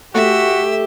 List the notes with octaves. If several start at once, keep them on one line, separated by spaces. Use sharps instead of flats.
A3 F#4 G4 E5